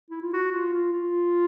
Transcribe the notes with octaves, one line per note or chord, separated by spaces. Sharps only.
E4
F4
F#4
F4
F4
F4